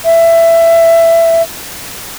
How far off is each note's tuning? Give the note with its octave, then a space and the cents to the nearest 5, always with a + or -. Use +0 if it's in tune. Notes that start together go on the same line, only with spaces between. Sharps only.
E5 +15